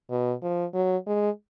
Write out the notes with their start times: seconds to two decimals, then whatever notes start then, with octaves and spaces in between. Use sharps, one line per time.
0.10 B2
0.43 F3
0.74 F#3
1.07 G#3